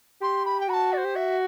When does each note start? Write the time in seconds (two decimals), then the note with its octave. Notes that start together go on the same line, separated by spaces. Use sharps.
0.21 G4 C6
0.45 B5
0.60 G5
0.68 F#4 B5
0.73 A5
0.92 D5
0.97 C5
1.04 G4
1.15 F#4 E5